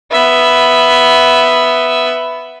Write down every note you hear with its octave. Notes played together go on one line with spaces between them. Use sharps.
B3 E5